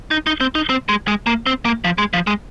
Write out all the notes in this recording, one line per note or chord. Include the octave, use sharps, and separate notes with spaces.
D#4
D#4
C4
D#4
C4
G#3
G#3
A#3
C4
A#3
F3
G#3
F3
G#3